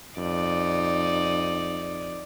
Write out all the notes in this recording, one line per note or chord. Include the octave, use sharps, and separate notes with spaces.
F2 D#4 D5